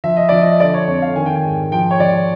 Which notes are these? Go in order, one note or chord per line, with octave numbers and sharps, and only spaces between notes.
F3 E5
D#5
F3 D5
D#5
D#5
D3 D5
C#5
F2 C#5
F5
D#3 G#5
G5
G#5
G#2
F3 G5
C#5
F3 D5